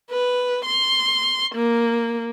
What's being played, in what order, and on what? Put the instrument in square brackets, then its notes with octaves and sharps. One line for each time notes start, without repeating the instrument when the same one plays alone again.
[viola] B4
C6
A#3